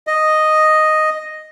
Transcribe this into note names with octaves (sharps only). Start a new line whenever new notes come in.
D#5